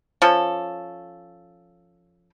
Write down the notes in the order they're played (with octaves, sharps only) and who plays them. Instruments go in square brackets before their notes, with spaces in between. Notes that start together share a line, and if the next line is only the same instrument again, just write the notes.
[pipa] F3 C#4 A4